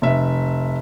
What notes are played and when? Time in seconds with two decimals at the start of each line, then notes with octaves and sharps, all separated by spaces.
0.02 F1 E5